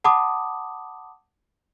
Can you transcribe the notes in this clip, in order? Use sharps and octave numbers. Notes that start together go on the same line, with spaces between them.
F#5 A5 B5 D6 D#6